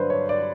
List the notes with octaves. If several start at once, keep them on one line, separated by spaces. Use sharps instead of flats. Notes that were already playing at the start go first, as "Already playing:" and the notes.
Already playing: G2 D3 F#3 B4 C5
C#5
D5